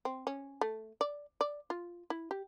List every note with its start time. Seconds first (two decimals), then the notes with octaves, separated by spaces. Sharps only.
0.05 C4
0.27 C#4
0.61 A3
1.01 D5
1.41 D5
1.70 F4
2.10 E4
2.31 G4